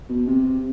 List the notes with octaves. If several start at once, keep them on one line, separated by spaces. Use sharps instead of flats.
B2
C3